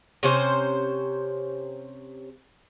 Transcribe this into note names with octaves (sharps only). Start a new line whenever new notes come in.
C3 C#4 C5